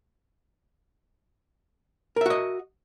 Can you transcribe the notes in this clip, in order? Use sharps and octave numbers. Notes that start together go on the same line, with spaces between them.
F#4 A#4 D#5 E5